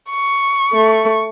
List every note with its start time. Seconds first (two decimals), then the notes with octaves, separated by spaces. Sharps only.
0.11 C#6
0.72 A3